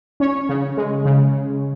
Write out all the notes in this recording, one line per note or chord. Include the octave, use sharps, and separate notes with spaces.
C#4 C#5
C#3
G#3
C#3